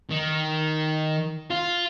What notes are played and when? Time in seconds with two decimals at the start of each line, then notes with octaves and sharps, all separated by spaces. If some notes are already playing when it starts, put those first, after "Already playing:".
0.10 D#3
1.50 F4